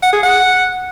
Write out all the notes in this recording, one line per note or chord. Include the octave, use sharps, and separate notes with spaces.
F#5
G#4
F#5